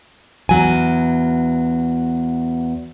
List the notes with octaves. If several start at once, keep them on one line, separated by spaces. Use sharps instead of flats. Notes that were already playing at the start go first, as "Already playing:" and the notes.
E2 F#3 G#5